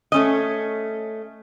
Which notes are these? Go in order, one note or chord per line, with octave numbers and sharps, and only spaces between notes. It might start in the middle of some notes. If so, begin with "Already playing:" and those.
A3 C#4 D#5